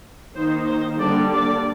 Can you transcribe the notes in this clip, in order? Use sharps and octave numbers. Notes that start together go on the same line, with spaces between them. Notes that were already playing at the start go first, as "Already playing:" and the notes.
D#3 A#3 D#4 C5
C5
D3 G3 A#3 D4 D5
D5